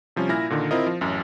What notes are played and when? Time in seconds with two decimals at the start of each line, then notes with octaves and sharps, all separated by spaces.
0.16 C3 F3 G3 C#4
0.29 A#2 E4 G#5 F6 A#6
0.50 A#2 D3 D#3
0.71 C4 E4 F4 A#4 D#5
0.87 F3
1.01 A1 F#2